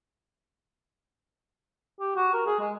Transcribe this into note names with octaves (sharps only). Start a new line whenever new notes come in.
G4
F#4
A#4
G#4
G#3